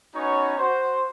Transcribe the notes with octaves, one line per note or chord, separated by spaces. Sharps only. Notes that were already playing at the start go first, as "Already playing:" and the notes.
B3 C#4 D#4 F#4 C#5
F#4 C5